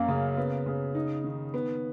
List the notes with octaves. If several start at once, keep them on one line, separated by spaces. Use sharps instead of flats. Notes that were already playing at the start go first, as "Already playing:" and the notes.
Already playing: F#2 A#3 C#4
C#3
B3
C#3
D#4
D#3
B3